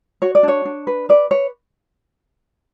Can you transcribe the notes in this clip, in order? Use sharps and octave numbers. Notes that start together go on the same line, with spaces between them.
F#4 C#5
D5
D4 C#5
D4
B4
B4 D5
B4 C#5